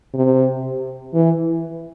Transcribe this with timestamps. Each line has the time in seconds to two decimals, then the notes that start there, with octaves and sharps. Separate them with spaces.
0.14 C3
1.14 E3